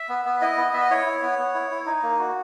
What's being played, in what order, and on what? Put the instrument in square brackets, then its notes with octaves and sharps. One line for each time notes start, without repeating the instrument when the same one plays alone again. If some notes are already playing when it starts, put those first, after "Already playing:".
Already playing: [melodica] E5
B3
B3
E4 D#5
B3
B3 E5
D#5
E4 C#5
E4
B3
B3
E4
E4
D#4
A#3
F#4